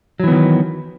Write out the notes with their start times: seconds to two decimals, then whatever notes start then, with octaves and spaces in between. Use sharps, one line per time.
0.20 F#3
0.24 E3
0.27 B3
0.31 D#3